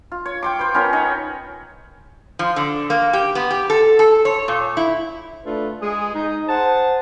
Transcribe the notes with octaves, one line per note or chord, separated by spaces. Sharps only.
F4
C#5
G5 C6 D6
B4 C5
B3 C#4 F4 A#4
B3 D#4 C#5
F3
D3
A#3
G4
B3
G4
A4
A4
C#5
A#2
E4
A3 D4 F4 A4 B4
G#3 G#4
D#4
G#4 C5 F#5 A5